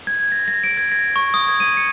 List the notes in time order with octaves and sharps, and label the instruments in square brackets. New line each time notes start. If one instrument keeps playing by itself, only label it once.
[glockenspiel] G#6
A#6
A#6
D7
G#6
A#6
C#6
D#6
G#6
D#7
C#7